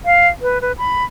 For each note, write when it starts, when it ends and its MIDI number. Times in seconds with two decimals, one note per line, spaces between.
0.05 0.28 77
0.42 0.58 71
0.62 0.72 71
0.78 1.04 83